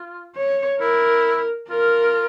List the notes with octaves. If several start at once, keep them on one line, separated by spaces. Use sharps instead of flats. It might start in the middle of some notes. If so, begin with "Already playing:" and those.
Already playing: F4
C#5
E4 A#4
F4 A#4